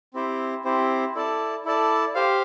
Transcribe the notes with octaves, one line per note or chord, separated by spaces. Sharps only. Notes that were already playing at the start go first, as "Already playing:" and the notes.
C4 E4 G4 C5
C4 E4 G4 C5
E4 A4 D5 A5
E4 A4 D5 A5
G4 C5 F5